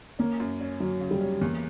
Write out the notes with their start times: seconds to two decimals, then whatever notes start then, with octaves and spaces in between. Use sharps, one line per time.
0.19 A#3 C#4
0.40 F#2
0.61 C#4
0.80 F#3 C#4
1.00 C#3
1.11 G3
1.21 C#4
1.41 E2 A#3